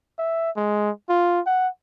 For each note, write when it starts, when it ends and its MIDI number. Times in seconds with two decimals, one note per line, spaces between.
0.19 0.51 76
0.57 0.91 56
1.10 1.41 65
1.47 1.68 78